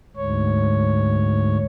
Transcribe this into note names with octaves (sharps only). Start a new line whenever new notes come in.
D2 G#2 C#5